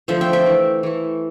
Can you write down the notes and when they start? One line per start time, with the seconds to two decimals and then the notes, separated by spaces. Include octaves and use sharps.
0.08 D3 F3 A3 C5 E5
0.21 E5 G5
0.33 E5 G5
0.46 E3 A3
0.83 E3 A3